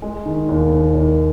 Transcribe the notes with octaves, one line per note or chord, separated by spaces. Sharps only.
G#3
D#3
D#2
D#3
D#2